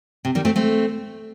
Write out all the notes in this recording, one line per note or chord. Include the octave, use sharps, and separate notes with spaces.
C3
D#3 G3
A3 C4
A3 C4